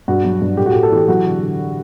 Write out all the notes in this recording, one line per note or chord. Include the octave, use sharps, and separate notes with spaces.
G2 F#4
F#3
G2
A2 G4
F#4
A2 G4
A4
E3 G4
F#3 F#4
D3
D3